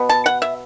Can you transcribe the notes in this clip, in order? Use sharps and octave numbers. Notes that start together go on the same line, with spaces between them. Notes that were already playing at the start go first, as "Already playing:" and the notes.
Already playing: B2 B3
A5
F#5
E5